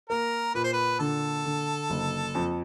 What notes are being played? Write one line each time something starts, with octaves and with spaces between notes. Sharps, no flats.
A#3 A#4
A#2 B4
C5
B4
D3 A4
D3
F#1
F2